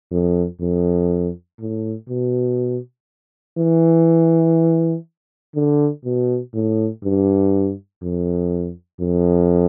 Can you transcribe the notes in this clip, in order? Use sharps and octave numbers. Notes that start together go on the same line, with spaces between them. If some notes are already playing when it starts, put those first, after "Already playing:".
F2
F2
A2
B2
E3
D3
B2
A2
G2
F2
F2